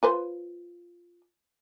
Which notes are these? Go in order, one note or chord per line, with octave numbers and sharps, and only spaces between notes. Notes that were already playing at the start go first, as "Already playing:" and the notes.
F4 B4 C5